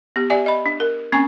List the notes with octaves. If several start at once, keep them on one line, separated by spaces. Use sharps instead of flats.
B3 G4
G4 D5 E5 G#5
D#5 B5
D4
A#4
A#3 C4 C#4 G#5 C#6